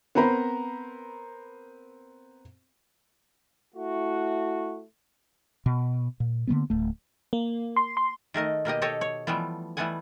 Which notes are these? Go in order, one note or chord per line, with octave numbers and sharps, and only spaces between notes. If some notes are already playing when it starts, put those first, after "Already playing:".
B3 C4 A#4 C5 A#5 B5
A3 E4 F#4
B2
A#2
D3 F#3 A#3 B3
D1 A3
A#3
C6
C6
D#3 A3 A#4 D#5
B2 A#3 G4 D#5
G4 A4 C#5 D#5
C#5
E3 F3 G3 A3 B3
E3 G3 A3 B3 F#5 G#5